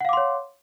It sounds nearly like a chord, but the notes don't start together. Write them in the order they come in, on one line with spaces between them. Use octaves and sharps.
F#5 F5 D6 C6 C#5